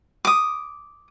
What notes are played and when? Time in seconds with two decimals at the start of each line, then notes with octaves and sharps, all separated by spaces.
0.25 D6 D#6